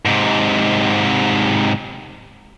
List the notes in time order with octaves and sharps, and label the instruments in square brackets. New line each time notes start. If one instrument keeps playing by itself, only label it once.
[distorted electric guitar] G#2 C3